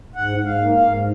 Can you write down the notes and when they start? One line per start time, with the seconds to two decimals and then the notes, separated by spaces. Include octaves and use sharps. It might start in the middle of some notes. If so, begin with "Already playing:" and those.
0.16 G#2 F#5
0.38 G#2
0.45 F5
0.58 A#3
0.73 F5
0.80 G#2